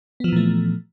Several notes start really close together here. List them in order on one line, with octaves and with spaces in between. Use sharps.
B3 F3 E3 A#2 A3